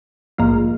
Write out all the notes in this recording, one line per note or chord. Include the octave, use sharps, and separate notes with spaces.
A#1 G#2 F3 A#3 F4